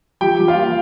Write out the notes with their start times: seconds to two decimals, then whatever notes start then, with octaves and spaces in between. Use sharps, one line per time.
0.21 F3 G4 G5
0.39 F3
0.48 F4 F5
0.58 A#3